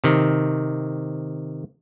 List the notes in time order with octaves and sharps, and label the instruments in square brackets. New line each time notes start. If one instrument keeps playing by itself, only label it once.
[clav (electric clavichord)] C3 D#3